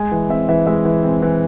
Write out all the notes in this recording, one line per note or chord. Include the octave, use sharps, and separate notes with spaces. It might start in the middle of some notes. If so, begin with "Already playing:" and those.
Already playing: G#3 G#5
E3
C4 E5
E3 E5
G#3 E5
E3
C4
E3